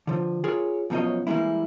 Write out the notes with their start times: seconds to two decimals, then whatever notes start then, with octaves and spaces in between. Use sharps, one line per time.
0.07 D3 F3
0.44 F4 G#4 A#4 C#5
0.90 F#2 B2 F3 A4 C#5 D#5
1.27 E3 G3 G#3 A#3 E4